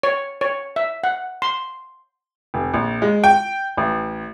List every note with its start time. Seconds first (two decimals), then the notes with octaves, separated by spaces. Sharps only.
0.03 C#5
0.41 C#5
0.76 E5
1.04 F#5
1.42 C6
2.54 F1
2.74 A#1
3.02 G#3
3.24 G5
3.77 A1